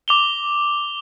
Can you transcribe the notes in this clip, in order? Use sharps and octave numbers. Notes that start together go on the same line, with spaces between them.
D6 F7 G7